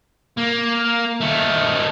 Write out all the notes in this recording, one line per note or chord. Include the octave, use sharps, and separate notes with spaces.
A#3
D#3 A3